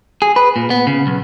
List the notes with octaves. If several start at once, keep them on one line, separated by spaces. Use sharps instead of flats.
G#4
B4
A#2
B3
C#3
B1